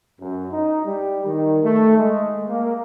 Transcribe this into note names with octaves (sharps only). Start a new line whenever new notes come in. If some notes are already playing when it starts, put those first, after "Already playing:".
F#2
D#4
G3
D#3
A3
G#3
A#3